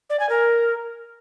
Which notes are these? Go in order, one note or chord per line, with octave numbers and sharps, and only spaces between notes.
D5
G#5
A#4